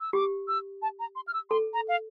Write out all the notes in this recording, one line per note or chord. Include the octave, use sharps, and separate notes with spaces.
E6
G4 D6
E6
A5
A#5
C6
F6
E6
A4 C6
A#5
F5